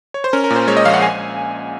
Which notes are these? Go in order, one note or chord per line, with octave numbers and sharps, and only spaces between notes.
C#5
C5
C#4 A#4
A#4
A#2
C5
G#3 C#5
D#5
A#1 F5
F#5
G#5